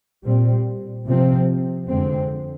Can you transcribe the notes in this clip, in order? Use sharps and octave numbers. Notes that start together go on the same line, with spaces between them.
A#2 G3 C4
C3 F3 C4
F2 D3 G#3 C4